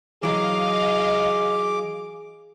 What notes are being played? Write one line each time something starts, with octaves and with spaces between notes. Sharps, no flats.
E3 F#3 G#4 D#5 F5 D6